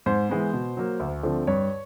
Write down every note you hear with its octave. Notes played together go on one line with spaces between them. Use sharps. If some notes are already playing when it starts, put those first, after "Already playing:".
G#2 C5
E3 G#3 B3
B2
F#3 A#3
D2
D3 F3 A3 C4
G2 C#5